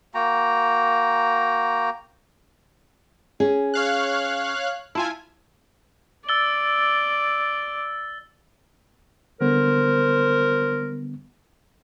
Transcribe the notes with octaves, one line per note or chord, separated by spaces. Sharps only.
A#3 F#4 G5 A#5
C#4 G#4
C#5 F5 F#6
E4 F4 G#5 A5
D5 E6 A6 G7
D3 G3 B3 A#4 C5